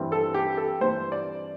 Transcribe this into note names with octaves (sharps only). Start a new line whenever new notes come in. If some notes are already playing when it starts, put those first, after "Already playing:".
Already playing: G2 E3 G3 C4
A4
G4
A4
G2 E3 G3 C4 C5
D5